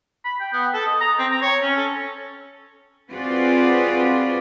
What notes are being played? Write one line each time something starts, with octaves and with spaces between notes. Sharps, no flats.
B5
G5
B3
A4
D#5
A#5
C4
A#5
C#5
C#4
A4
C4 F4 F#4 G#4 B4 D5